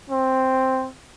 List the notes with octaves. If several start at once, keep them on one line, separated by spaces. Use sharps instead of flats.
C4